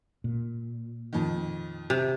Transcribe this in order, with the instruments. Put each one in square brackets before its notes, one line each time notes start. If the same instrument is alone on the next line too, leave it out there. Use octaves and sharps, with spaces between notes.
[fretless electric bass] A#2
[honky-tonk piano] F2 D#3
[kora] C3